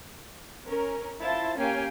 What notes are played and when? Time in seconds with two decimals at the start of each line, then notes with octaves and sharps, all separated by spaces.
0.67 C#4 A#4
1.21 E4 F4 C5 A5 A6
1.57 A#3 C#4 G4 F5 G5 G#5